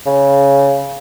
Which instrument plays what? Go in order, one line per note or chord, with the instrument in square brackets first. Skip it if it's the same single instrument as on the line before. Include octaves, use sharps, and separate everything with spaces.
[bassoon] C#3